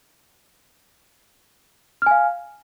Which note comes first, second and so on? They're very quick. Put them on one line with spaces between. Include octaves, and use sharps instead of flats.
F6 G#5 F5